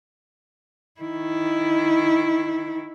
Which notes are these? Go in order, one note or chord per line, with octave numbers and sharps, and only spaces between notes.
D#3 E4